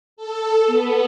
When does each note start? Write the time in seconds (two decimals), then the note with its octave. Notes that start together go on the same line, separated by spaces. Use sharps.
0.17 A4
0.67 B3